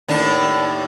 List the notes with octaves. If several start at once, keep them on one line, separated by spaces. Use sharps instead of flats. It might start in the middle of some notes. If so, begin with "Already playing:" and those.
D#2 A2 D4